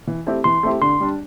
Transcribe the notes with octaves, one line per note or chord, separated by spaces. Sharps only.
E3
A3 C4 E4 G4
E3 C6
A3 C4 E4 G4
D3 C6
G3 D4